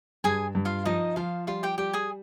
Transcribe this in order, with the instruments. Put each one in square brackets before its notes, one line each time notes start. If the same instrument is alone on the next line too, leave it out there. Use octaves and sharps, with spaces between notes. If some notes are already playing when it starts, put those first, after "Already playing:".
[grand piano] G2 [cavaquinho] G#4 G#5
[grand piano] G2
[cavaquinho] F4 F5
[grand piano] F3 [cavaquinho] D#4 D#5
[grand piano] F3 [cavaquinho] F4 F5
[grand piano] G3 [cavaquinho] F4 F5
[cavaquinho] G4 G5
[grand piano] G3 [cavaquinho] G4 G5
[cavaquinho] G#4 G#5